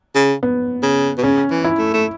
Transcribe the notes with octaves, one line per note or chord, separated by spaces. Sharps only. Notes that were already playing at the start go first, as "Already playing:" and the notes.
C#3
B3
C#3
B2
C#3 C#4
E3
E4
A3
A3